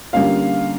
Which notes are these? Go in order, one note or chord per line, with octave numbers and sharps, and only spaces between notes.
D3 G3 A#3 C#4 F4 F5